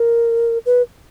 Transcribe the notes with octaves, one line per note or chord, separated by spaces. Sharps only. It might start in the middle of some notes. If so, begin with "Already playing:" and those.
Already playing: A#4
B4